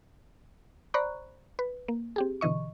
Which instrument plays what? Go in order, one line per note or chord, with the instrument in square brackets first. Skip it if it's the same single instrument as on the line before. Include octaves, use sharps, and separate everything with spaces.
[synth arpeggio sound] C5 D5 A#5 B5 C#6 F#6
B4
A#3
C4 G4 G#4
B2 D3 E3 D#5 C#6